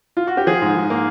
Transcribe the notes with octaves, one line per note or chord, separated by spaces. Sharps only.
F4
F#4
G4
F3 G#4
G#2
G#2
A#3